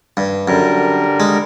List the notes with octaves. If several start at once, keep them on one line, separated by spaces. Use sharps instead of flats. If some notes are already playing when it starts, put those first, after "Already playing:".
G2
F#2 D3 G3 A#4
G#3